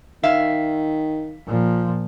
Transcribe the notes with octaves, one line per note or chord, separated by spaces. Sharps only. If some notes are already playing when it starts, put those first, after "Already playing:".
D#3 E5 F5
A#2 F3